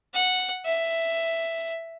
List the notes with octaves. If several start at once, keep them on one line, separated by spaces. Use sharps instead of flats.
F#5
E5